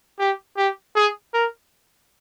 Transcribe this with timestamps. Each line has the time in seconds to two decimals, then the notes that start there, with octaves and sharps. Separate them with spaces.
0.19 G4
0.57 G4
0.96 G#4
1.34 A#4